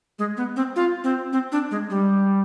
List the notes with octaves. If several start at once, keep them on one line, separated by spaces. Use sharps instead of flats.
G#3
B3
C4
F4
C4
C4
D4
G#3
G3